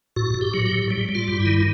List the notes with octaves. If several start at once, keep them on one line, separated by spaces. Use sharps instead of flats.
A2 F#4
A2
G4
F#3
G4
A2
G3
G3
F4
G2
E4
D#3